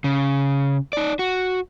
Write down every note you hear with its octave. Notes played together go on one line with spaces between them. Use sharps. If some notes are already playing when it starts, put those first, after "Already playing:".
C#3
D#4 D5
F#4